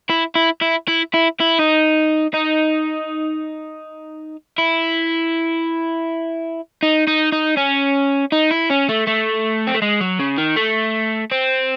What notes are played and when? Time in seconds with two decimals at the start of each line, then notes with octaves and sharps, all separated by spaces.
0.09 E4
0.35 E4
0.62 E4
0.88 E4
1.14 E4
1.40 E4
1.59 D#4
2.34 D#4
4.58 E4
6.83 D#4
7.07 D#4
7.32 D#4
7.57 C#4
8.32 D#4
8.51 E4
8.70 C#4
8.89 A3
9.07 A3
9.67 C4
9.74 A3
9.82 G#3
10.01 F#3
10.20 C#3
10.38 D#3
10.56 A3
11.31 C4